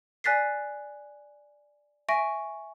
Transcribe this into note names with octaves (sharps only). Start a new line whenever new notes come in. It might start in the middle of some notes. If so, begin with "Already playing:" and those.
D5 G#5 F#6 A6 B6 C7
E5 G#5 C#6 A#6 D7